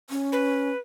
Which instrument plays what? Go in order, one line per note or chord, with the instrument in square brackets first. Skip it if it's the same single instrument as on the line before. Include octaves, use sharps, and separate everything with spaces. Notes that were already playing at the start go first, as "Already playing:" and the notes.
[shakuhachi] C#4
[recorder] B4